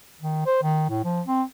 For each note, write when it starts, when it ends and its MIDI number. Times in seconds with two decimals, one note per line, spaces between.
0.21 0.43 51
0.46 0.60 72
0.63 0.85 51
0.90 1.04 45
1.04 1.21 53
1.27 1.42 60